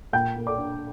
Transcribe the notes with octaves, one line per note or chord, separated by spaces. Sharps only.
A#2 G5 G6
A#3
D5 D6
D4